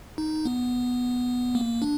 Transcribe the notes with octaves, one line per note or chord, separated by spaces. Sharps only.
D#4
B3
A#3
D4